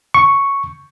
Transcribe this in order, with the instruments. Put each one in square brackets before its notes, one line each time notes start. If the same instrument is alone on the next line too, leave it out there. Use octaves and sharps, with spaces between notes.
[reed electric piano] C#6